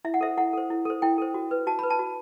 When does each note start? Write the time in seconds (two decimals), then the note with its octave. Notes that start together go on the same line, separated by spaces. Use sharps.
0.05 E4 E5
0.14 F#5
0.21 A4 C5 E5
0.37 E4 F#5
0.53 A4 C5
0.70 E4
0.85 A4 C5
1.02 E4 G5
1.18 A4 C5
1.34 F#4
1.51 B4
1.67 F#4 A5
1.79 B4 B5
1.90 A5
1.99 F#4